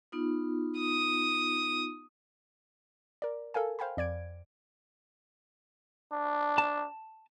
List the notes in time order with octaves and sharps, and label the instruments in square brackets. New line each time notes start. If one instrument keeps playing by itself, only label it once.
[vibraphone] B3 D#4 F4
[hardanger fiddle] D#6
[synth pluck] A#4 D5
A4 A#4 F5 G#5
C5 F5 G5 G#5 B5
F2 D5 G#6 D7
[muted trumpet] D4
[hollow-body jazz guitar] A5